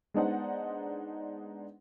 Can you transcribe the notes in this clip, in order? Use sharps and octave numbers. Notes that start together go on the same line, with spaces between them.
G#3 B3 D4 D#4 C5 F#5